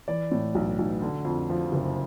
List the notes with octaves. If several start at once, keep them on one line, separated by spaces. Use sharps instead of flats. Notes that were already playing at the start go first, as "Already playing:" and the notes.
E3 D5
A2
B1
B1
D3
F2
F3
F#1